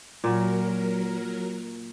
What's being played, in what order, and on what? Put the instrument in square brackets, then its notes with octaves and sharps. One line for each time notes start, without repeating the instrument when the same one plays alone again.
[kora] A#2 F#4 [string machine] F#3 A#4